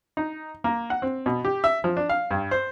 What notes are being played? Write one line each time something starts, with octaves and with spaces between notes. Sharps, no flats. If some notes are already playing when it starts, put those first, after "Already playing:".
D#4
A#3
F#5
C4
B2
G4
E5
F3
D4
F5
G2
C5